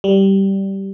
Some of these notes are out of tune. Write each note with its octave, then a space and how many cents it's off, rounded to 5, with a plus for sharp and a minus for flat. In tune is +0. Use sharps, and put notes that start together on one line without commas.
G3 -10